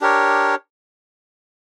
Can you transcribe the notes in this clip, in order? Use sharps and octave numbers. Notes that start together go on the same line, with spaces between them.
D4 G4 A#4 C#5